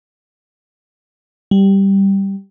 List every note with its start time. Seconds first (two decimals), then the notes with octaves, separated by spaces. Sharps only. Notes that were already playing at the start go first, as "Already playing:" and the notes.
1.51 G3